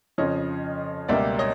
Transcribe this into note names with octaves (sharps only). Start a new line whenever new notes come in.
F2 C#3 F3 C#5 D#5
C#2 B2 G3 A#3 D5 E5
C#5 D#5